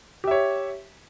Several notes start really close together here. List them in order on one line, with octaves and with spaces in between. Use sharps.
G4 E5 C#5